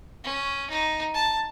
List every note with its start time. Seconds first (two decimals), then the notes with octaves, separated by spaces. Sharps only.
0.24 C#4
0.70 D#4
1.14 A5